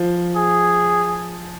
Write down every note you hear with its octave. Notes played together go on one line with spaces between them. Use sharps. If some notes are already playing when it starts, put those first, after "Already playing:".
Already playing: F3
G#4